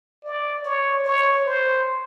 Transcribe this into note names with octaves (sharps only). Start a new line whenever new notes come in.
D5
C#5
C#5
C5